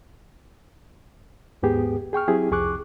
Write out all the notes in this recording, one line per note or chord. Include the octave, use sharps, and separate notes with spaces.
D#2 G#2 B3 G4 G#4
G#4 G5 C#6 F6
F#3 C4 E4 G4 G#4
C2 F2 G#4 C#6 D6 F#6